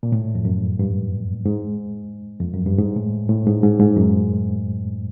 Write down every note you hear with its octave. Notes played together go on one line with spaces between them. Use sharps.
A#2
A2
F2
F#2
G2
G#2
F2
F#2
G2
G#2
A2
A2
G#2
G#2
G#2
F#2